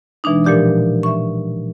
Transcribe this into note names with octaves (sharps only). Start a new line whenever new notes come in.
B2 E3 G#3 D4 D#4
A#2 F3 G4 D5 D6
E5 C#6